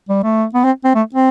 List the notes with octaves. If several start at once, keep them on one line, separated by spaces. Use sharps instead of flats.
G3
A3
B3
C4
C4
A3
C4